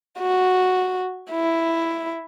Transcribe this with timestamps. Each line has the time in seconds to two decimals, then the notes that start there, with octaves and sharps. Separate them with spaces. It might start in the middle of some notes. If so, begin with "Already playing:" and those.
0.19 F#4
1.31 E4